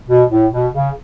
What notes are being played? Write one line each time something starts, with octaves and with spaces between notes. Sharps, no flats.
B2
A2
B2
C#3